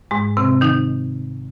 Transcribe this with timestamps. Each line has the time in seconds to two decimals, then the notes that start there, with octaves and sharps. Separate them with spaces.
0.11 G#2 G#3
0.37 C3 C4
0.61 D#3 D#4